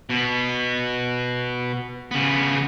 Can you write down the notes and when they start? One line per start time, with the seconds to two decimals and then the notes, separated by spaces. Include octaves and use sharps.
0.09 B2 B3
2.11 C#3 B3